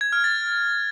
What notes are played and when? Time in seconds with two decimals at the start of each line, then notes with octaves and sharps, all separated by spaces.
0.01 G#6
0.12 F6
0.24 A6